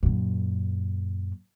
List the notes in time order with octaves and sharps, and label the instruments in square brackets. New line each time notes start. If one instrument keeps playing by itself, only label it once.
[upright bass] F#2 A#2